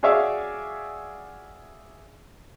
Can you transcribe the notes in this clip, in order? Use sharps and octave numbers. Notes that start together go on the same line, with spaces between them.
F#4 G#4 C#5 D5 E5 F5